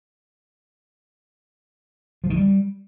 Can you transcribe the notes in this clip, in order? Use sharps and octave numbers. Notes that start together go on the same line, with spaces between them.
F3
D#3
G3